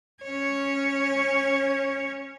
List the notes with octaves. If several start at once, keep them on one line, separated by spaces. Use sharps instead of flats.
C#4 C#5